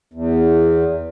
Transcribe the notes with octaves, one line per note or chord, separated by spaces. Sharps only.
E2